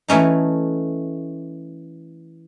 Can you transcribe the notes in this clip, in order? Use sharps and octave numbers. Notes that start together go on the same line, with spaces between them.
E3 A3 C#4 D#4